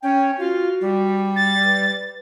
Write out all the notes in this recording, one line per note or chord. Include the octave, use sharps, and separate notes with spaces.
C#4 G5
F4 F#4
G3
A6
B4